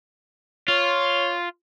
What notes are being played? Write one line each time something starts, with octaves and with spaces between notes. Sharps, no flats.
F4 C#5